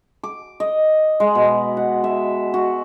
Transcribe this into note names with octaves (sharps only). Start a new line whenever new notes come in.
D6
D#5
G#3
B2
F#5
E5
F#4